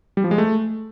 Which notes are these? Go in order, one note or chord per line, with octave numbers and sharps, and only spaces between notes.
G3
F3
G#3
A3